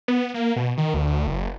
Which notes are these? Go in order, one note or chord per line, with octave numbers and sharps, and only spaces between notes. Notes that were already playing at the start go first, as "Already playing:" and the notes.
B3
A#3
B2
D#3
D2
F#1